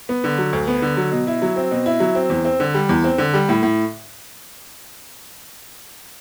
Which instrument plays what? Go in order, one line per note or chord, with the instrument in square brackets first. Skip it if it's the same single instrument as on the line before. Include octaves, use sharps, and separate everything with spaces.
[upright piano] B3
D3
F#3
D2
B3
D3
F#3
B2
E4
F#3
C4
B2
E4
F#3
C4
E2
C4
D3
G3
E2
C4
D3
G3
A2
A2